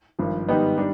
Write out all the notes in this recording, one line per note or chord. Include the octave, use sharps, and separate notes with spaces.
G#1 G2 F3
G#2 D#3 G3 B3 D#4
D#3 G3 D4